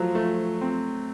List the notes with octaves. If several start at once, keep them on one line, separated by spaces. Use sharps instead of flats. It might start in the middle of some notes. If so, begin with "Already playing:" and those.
Already playing: F3 F#3 A3
A3
C4